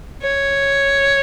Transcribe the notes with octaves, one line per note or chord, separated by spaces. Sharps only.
C#5